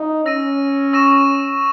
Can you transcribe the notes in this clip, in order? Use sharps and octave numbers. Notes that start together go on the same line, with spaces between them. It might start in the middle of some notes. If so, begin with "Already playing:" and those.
Already playing: D#4
C#4 E6 A#6 D#7
C#6 E6 A#6 E7